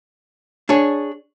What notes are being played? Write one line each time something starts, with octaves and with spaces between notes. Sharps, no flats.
D4 G#4 C#5